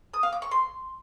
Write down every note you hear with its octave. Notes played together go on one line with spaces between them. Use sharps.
D#6
F5
D6
C#6
C6